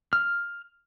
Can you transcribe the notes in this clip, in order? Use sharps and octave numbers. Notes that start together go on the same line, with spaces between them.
F6